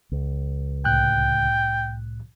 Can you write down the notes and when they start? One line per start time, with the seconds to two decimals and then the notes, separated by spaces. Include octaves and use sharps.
0.12 C#2
0.85 C2 A2 G5 F#6